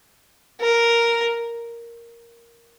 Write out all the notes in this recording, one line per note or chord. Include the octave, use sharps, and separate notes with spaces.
A#4